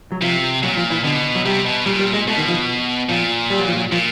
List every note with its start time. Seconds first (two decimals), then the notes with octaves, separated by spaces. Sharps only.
0.12 F#3
0.22 C3 F3
0.63 A#2 F#3
0.77 F3
0.90 E3
1.04 B2 D3
1.35 F#3
1.46 C3 G3
1.66 B2
1.86 A#2 G3
1.99 G3
2.14 G#3
2.27 B2 A3
2.38 D#3
2.48 F3
3.09 A#2 F3
3.50 G3
3.59 F#3
3.68 F3
3.76 F#3
3.92 A#2 F3